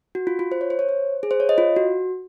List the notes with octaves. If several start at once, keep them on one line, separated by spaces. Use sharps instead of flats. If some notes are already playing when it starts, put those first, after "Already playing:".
F#4
F4
F4
C5
C#5
C5
C#5
C5
G#4
C5
C#5
D#5
F4
F#4